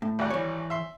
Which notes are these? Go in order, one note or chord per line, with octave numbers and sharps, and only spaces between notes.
A2
G#1 G3 F#5
E3 C#5
E5 C6